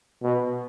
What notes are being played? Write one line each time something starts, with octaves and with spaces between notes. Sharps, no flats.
B2